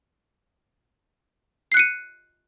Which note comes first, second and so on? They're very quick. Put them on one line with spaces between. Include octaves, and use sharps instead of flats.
C7 F#6 C#7 D#7